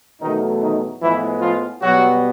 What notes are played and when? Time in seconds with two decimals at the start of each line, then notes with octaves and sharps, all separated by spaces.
0.20 E2 B2 D#3 F#3 A3 D#4
0.60 D#3 D#4
1.00 A2 E3 F3 G#3 B3 E4
1.41 F3 F4
1.81 B2 F#3 G3 B3 F#4